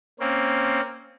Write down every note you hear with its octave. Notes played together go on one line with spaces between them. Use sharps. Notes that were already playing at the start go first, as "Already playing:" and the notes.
A#3 C4 C#4